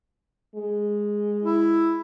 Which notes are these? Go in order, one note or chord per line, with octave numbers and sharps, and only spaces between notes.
G#3
E4